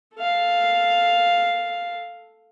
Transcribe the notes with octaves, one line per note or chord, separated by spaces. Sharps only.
A4 F5